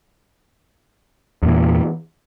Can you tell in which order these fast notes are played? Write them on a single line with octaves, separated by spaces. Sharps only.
E2 A#2 E3